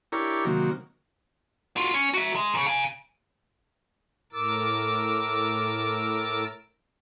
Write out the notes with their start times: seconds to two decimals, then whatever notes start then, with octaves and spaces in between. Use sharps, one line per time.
0.12 D4 E4 G4 A#4 C#5
0.45 C3 D#3 F#3 A#3
1.77 F4 F#4
1.94 C#4
2.14 F#4 E5
2.36 G#3
2.54 A#2 C#3
2.66 F5 G#5
4.33 A2 A#4 D6 E6 A6